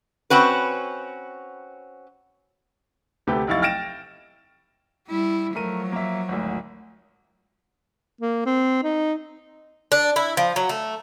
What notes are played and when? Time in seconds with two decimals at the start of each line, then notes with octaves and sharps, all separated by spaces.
0.30 C4 C#4 F#4 B4
3.27 D2 C3 A3 G4 B4 G5
3.47 F1 B1 E4 F5 C#6 A6
3.62 G5 F6 A6 A#6 D7 E7
5.08 G3 E4
5.55 F3 F#3 A3 A#4 D#7
5.92 A#3 E5
6.28 G#1 D2
8.21 A#3
8.46 C4
8.83 D#4
9.92 D4
10.16 E4
10.37 F3
10.56 F#3
10.69 A3